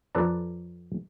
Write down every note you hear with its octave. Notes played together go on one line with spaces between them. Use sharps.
F2 A4 B4 D5 A#5